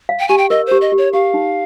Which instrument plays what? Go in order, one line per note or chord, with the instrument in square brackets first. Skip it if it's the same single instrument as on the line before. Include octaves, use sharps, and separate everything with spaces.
[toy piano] F5
[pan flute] G5
[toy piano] G4 [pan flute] G#5
[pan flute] G5
[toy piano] A#4 [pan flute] D#5
[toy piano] G4 [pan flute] C5
[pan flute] D#5
[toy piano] G4
[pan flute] C#5
[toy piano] G4 [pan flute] F5
[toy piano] D#4